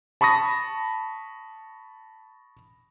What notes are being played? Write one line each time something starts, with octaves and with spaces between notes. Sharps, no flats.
A5 B5 C#6 D#6 A#6